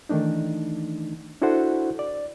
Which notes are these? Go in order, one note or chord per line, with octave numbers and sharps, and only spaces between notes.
D#3 E3 A3 D4 D#4
D4 E4 F#4 A4 C5 F#5
D5